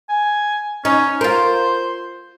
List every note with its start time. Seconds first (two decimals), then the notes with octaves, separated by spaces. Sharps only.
0.09 G#5
0.85 C#4 D#4
1.21 F4 A#4 C5